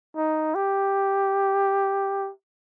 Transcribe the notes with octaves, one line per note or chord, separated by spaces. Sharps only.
D#4
G4